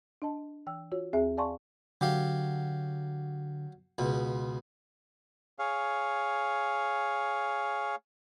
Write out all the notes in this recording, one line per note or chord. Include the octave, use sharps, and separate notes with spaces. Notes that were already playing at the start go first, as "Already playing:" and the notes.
D4 D#5 A5
E3 G5 E6
F4 F#4 C#5
D#2 C4 G#4 E5 G#5
D5 F5 G#5 A5 C6 C#6
D3 F#3 G4 F5
C#2 B2
G#4 C#5 F5